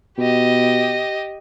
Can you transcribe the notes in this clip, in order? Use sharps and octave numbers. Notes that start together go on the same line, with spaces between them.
B2 G4 D#5